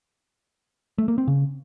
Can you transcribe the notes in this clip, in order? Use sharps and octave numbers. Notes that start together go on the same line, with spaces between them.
A3
A#3
C4
C#3